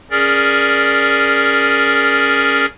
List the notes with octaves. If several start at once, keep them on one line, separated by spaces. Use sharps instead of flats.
C#4 G#4 A#4 D5